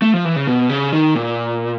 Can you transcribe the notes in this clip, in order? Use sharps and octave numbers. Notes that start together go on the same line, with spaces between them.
A3
F3
E3
C#3
B2
C#3
D#3
A#2